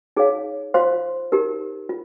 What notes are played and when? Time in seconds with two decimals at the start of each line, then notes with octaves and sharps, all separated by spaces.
0.17 D#4 G#4 C#5 F5
0.74 F4 C5 F5 C6
1.32 D#4 G4 A#4
1.89 F4